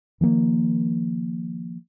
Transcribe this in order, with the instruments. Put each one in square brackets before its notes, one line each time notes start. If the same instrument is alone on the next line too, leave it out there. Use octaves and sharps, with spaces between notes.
[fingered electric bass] D#3 F3 G#3 A#3